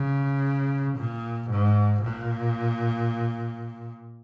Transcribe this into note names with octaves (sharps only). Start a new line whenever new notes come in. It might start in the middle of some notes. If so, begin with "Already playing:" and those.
Already playing: C#3
A#2
G#2
A#2